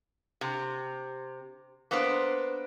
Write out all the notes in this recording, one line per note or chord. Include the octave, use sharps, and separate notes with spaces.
C3
A#3 B3 D4 B4 C5